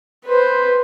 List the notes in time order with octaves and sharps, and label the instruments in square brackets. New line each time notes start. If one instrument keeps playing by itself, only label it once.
[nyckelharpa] B4 C5